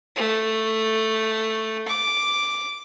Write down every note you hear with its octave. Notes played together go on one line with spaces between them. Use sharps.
A3
D6